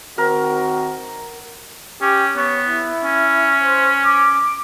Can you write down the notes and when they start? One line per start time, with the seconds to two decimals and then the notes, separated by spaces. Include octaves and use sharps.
0.18 D#3 C4 F#4 A#4
2.01 C#4 G4
2.36 B3 C#5
2.68 E4
3.03 C#4
3.62 C5
4.05 D6